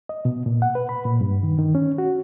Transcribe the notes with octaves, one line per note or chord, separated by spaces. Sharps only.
D#5
B2
A#2
F#5
B4
B5
A#2
G2
D#3
D#3
C#4
F#4